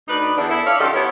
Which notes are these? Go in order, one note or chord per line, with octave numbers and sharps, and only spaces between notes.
D2 D#4 B4 D5
E2 D4
E4 A4
D4 C#5 D5 E5 F5
F#2 D#3 F4 G4 A4 D#5
B3 E4 C#5